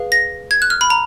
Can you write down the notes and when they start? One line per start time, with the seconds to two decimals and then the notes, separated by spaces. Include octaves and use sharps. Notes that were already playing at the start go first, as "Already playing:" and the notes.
Already playing: G#4 B4 F5
0.12 A#6
0.51 G#6
0.62 F#6
0.70 F6
0.81 B5
0.90 A#5